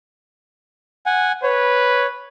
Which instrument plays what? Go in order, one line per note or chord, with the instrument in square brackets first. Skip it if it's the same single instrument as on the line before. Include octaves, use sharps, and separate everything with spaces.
[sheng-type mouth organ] F#5 G#5
[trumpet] B4 [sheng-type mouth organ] C#5